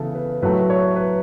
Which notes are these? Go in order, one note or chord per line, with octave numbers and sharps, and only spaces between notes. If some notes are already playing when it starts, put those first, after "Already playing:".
Already playing: C#3 E3 B3 A4
B4
A2 F#3 A3 B4
C#5
B4